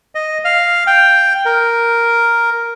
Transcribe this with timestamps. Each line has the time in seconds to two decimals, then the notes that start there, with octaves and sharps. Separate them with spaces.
0.15 D#5
0.45 F5
0.87 G5
1.45 A#4